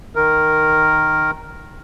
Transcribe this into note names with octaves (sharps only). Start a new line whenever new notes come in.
D#3 A#4